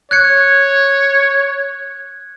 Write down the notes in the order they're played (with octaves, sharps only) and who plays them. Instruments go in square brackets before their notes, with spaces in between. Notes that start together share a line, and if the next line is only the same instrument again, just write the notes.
[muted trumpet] C#5 [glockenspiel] F#6 G#6 C#7